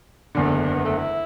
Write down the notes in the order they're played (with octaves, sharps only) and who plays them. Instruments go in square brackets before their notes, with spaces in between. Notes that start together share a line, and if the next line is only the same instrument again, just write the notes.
[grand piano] F#1 E2 D3
[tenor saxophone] A3
G#3
D4
B3
A3
E4